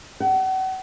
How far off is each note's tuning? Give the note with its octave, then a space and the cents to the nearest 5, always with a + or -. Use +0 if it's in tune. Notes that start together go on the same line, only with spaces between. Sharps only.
F#5 +40